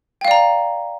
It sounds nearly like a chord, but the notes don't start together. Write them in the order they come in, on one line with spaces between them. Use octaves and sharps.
G5 F5 D5 A#5